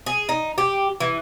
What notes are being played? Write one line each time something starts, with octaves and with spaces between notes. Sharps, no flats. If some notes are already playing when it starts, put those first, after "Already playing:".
G#4
D#4
G4
E3